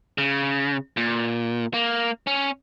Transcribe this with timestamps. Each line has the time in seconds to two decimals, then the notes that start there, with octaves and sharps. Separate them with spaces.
0.18 C#3
0.97 A#2
1.74 A#3
2.27 C#4